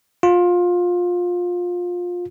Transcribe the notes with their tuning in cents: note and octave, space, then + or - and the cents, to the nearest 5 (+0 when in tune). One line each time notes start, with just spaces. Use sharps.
F4 +20